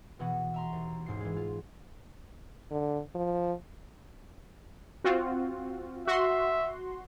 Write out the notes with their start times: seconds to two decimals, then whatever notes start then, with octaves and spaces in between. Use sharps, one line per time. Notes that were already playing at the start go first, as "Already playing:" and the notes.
0.19 B2 E3 B3 F#4
0.54 E5 A#5 C6
0.73 D#2
1.06 A1 G#2 C7
1.20 E3 G#3
1.36 F4
2.71 D3
3.15 F3
5.04 C4 F4 F#4
6.07 F#4 E5 C6